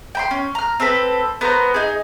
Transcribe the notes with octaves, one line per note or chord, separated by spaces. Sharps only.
G5 B5 C6
C#4
A#5 F6
C4 A4 B4
B3 A#4 C5 A#5
D#4 G#4